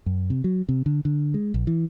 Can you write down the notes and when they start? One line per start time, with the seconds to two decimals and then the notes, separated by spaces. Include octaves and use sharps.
0.06 F#2
0.30 C3
0.44 F#3
0.69 C3
0.86 D3
1.05 D3
1.34 G#3
1.54 A#1
1.67 E3